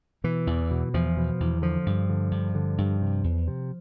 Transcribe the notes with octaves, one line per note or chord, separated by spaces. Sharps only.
B2 E3
E2
B2
E2 F3
B2
E2
D3 F3
G2
D3
G2
D3
G2
C3
E2
C3